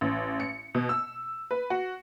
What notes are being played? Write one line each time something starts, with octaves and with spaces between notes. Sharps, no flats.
A1
C#7
B2
E6
B4
F#4